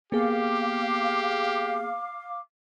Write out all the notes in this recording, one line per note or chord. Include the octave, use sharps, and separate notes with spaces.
A#3 B3 G4 G#4 F5 D6